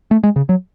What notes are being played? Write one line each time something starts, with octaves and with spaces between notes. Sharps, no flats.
A3
G#3
C#3
F#3